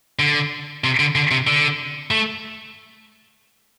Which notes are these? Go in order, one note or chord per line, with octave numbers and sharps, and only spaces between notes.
D3
C3
D3
D3
C3
D3
A3